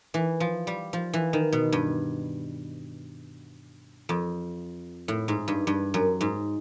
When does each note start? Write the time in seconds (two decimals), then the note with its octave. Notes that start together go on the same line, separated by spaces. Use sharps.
0.14 E3
0.40 F3
0.67 G3
0.93 F3
1.13 E3
1.33 D#3
1.53 B2
1.72 G2
4.09 F2
5.08 A2
5.28 G#2
5.48 G2
5.67 G2
5.94 F#2
6.21 G#2